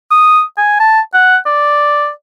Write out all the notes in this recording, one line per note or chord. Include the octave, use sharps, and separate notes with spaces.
D#6
G#5
A5
F#5
D5